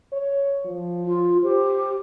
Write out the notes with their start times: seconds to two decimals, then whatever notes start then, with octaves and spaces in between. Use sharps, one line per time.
0.13 C#5
0.65 F3
1.05 F4
1.44 G4 C5